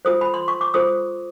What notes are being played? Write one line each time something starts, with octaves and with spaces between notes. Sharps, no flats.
F4 A4 C5 D#6
B5
C6
C#6
D6
F4 A4 C5 D#6